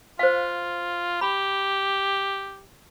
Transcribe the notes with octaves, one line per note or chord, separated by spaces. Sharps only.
F4 C5 F5
G4 B5